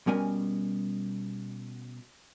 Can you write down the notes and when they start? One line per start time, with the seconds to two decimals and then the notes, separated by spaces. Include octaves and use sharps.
0.07 B2 G3 C#4 A#4 G#5